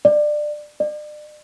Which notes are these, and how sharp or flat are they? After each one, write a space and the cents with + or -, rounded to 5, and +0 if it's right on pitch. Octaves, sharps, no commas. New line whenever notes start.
D5 +20
D5 +40